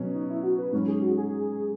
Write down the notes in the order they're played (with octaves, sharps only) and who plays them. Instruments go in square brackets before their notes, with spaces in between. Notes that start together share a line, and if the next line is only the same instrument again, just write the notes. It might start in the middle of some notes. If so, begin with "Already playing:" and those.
Already playing: [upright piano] B2 F#3 C#4
[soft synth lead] D#4
E4
F#4
B4
[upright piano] G#2 F#3 C#4
[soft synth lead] G#4
F#4
G#4